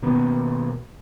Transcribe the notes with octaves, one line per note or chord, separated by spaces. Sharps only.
B2 D#3 A#3 B3